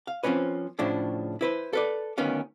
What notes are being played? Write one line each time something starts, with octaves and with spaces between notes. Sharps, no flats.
F5
F3 F#3 C4 C#4 B4
A2 C#3 F3 D4 E4
E4 B4 C5
A4 B4 D5
D2 D#3 B3 C#4 F5